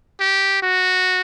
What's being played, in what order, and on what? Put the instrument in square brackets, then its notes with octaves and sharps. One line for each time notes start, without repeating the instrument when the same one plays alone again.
[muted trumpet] G4
F#4